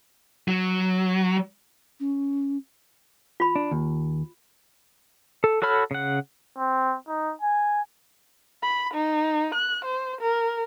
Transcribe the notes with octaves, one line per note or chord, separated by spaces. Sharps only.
F#3
C#4
F4 B5
D4
D#2
A4
F#4 A4 C#5 B5 F6
C#3 F#5
C4
D#4
G#5
B5
D#4
F#6
C5
A#4